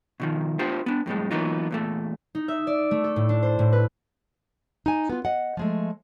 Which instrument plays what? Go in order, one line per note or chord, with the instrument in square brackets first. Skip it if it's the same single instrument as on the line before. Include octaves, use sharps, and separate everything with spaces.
[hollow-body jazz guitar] B2 D#3 F3
B3 D4 F4 G4 C5
B3 D4
F2 A2 G3 G#3
E3 F#3 A#3 B3 D#4 F4
E2 A#2 A3
[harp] D#4
E5
D5
A3
A4
A2
D4
C5
A2
B4
[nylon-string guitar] D#4 G#5
B3 F4
D#5 F#5
F3 G#3 A3